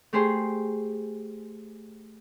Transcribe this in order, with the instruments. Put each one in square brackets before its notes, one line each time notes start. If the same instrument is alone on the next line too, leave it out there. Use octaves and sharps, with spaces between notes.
[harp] A3 G4 G#4 C5